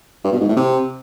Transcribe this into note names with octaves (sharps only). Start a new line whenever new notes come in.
G2
B2
G#2
A2
C3